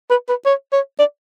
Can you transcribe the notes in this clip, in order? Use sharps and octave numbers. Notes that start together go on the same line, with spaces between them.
B4
B4
C#5
C#5
D5